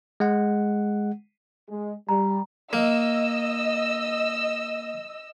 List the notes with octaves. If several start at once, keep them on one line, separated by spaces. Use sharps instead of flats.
G#3 F#5
G#3
G3 A#5
A#3 D#5 E6